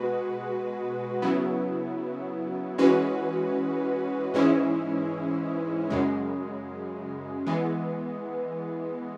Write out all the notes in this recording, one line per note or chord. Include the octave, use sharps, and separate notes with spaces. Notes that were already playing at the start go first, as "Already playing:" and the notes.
Already playing: B2 G#3 F#4 B4
C#3 F#3 B3 E4
E3 G#3 C#4 F#4 B4
G#2 E3 G#3 C#4 E4
F#2 C#3 G#3
E3 G#3 B3